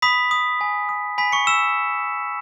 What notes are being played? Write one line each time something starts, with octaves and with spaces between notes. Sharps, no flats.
B5 D#6 B6
D#6
G#5
D#6
G#5 B5 B6
C#6 C#7
E6 E7